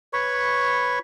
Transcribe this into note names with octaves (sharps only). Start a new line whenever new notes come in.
B4 C#5 B5 C#6